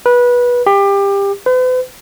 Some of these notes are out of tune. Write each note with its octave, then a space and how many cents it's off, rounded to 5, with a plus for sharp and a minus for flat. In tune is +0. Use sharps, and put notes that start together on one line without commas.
B4 -20
G4 +25
B4 +45